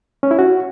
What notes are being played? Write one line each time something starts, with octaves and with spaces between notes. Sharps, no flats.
C#4
E4
F#4